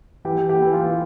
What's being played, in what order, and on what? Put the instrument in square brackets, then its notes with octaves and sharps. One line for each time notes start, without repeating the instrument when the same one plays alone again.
[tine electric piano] E3 [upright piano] G4
[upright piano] G4
[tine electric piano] E3
[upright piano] F4